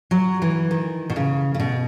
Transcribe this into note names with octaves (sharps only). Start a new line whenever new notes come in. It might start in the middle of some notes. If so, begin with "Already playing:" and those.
F#3
E3
D#3
B2
C#3
C#3
B2